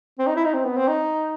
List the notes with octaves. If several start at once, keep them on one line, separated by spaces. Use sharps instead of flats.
C4
D#4
E4
D#4
C4
B3
C4
D#4